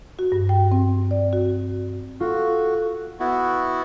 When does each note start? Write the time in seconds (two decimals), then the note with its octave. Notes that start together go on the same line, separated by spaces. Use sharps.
0.19 F#4
0.32 G2
0.49 G5
0.72 C4
1.11 D5
1.33 F#4
2.20 F4 F#4 A4
3.20 B3 E4 F#4